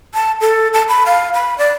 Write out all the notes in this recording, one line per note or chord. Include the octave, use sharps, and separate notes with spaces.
A5
A4
A5
B5
F5
B5
D5